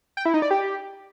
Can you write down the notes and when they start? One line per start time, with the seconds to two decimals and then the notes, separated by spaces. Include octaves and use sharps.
0.17 G5
0.25 E4
0.34 D#4
0.42 D5
0.51 G4